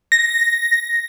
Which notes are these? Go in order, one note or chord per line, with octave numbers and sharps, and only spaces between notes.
A#6